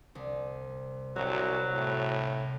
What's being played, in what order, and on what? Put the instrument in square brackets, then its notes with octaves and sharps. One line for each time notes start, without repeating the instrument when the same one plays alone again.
[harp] C2
[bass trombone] C2 [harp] C3 F#4 [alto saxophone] F#3
[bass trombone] A2